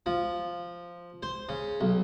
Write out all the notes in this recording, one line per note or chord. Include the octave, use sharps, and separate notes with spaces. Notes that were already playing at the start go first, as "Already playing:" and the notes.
F3
C5
C#3
B1